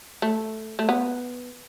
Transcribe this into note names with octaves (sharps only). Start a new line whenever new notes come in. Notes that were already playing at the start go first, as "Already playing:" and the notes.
A3
A3
B3